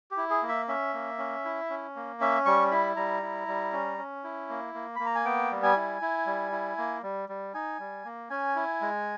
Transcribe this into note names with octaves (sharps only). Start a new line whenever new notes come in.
G4
E4
G#4
A#3
E5
C#4 E5
A#3
C#4
E4
C#4
A#3
C#4 E5
G3 C#6
E4 B5
G3 A#5
E4
G3
C#4
C#4
E4
A#3
A#3
A#3 B5
A#5
G#5
B3 G5
G3
G#5
E4
E4
G3
E4
A#3
G3
G3
D#4 G#5
G3
A#3
C#4 G#5
E4
G#3